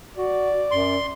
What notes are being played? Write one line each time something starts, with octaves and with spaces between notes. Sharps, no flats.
F#4 D5
F#2 C6